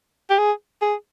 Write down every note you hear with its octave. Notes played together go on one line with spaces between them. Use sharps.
G4
G#4
G#4